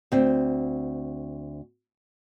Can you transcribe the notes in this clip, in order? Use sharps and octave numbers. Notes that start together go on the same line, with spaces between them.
D2 C4